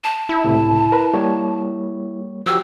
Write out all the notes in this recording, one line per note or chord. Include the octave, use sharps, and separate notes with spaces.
A5
E4
C#2 A2 C3
A#4 B4
G3 A#3 C#5
F3 F#4 G4 E6